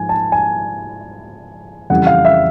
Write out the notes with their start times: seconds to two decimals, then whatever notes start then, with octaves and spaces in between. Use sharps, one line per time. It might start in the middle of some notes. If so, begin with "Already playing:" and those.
Already playing: G#2 F3 G#5
0.09 A5
0.32 G#5
1.90 F2 C#3 E3 G3 F#5
2.07 F5
2.25 E5